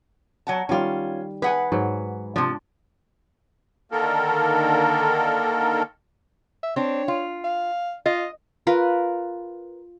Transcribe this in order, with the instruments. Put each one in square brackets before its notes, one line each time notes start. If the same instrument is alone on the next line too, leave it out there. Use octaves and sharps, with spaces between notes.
[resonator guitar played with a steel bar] F#3 F#5 A5
[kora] D#3 G3 [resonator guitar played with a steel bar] C#4 F4
[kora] G#4 [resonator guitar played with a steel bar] B4 F#5 G#5
[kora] G#2 F#3
[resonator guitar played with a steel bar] C3 F3 [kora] D4
[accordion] D3 D#3 A#3 A4 A#4
[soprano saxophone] E5
[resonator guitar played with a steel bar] C4 D4 [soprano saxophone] C#5
[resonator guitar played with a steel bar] F4
[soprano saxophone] F5
[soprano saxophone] F4 [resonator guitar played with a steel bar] D#5
[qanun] F4 A#4 B4